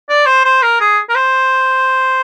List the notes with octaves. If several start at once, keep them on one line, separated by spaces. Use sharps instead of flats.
D5
C5
C5
A#4
G#4
A#4
C5